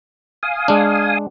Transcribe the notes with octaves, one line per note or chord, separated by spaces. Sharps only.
F5 G#5 D#6
G#3 D4